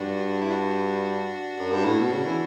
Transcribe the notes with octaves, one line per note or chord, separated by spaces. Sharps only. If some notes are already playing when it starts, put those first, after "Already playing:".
Already playing: G2 D4 F#4
E4
D4 F#4
F#2
G2
A2
B2
C#3
E3